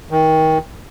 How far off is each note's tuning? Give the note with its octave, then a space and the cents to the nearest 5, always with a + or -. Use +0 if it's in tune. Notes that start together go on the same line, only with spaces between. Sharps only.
D#3 +25